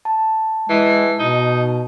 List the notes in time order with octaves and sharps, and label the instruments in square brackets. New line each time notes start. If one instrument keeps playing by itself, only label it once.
[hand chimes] A5
[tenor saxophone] E3 [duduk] G#3
[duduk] B2 [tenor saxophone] D#4